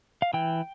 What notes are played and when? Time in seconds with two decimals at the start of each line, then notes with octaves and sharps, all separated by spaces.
0.22 F5
0.33 E3 G5